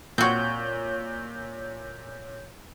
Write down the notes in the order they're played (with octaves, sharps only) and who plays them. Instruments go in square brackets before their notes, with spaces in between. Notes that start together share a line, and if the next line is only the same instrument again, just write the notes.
[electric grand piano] A#2 [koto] C4 F#4 [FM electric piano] C#5 G6